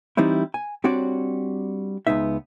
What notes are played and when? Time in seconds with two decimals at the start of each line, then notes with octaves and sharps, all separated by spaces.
0.17 E3 G3 C4 D#4 E4
0.54 G#5
0.84 G3 C4 D4 F#4 C#5 D5
2.07 C#2 G#3 B3 D#4 E5